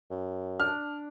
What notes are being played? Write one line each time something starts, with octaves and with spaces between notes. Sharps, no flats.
F#2
D4 F6